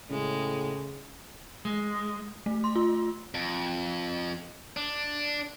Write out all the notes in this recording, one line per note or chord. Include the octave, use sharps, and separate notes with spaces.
A2 C#3 G#3
G#3
A3
C6
F4
F2
D4